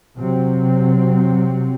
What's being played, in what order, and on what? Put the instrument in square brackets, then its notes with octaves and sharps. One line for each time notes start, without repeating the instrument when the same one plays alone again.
[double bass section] C3 F#3 C4